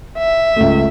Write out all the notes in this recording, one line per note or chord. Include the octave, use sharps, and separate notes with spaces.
E5
C#2 A3